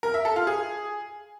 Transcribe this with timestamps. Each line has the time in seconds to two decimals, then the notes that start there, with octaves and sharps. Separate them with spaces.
0.03 A#4
0.14 E5
0.25 A4
0.36 F4
0.47 G#4